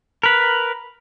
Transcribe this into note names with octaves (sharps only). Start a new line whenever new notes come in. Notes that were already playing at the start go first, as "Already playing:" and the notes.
A#4 B4